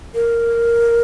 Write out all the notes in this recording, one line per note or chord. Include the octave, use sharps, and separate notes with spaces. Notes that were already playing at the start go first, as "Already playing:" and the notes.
A#4